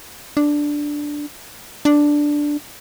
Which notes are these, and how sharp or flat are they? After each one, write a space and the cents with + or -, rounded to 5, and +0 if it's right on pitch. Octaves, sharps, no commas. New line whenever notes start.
D4 +0
D4 +0